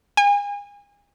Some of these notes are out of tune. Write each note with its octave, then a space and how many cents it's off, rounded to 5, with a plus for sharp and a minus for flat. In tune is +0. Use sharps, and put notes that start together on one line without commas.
G#5 -35